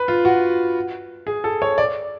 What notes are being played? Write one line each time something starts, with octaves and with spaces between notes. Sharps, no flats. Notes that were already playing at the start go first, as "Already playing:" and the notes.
Already playing: B4
F4
F#4
G#4
A4
C#5
D5